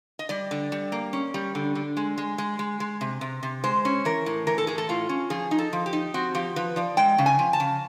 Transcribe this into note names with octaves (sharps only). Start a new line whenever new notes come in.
D#5
G3 D5
D3
G3
A#3
C#4
G3
D3
D3
G#3
G#3
G#3
G#3
G#3
C3
C3
C3
G#3 C5
C#4
E3 A#4
A2
E3 A#4
A4
A2 G#4
A4
A2 F4
C#4
F3 G#4
D#4
A4
F3
G4
D#4
C4 F#4
F3 G4
F3 B4
F3 D5
G#3 G5
C#3
G#5
F3
A5
C#3